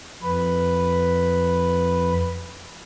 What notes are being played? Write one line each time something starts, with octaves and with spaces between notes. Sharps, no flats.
F2 B4